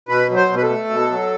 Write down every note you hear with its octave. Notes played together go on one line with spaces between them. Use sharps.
B2 B4
F#3
C5
B2
B4
A4
A3
B2
F#3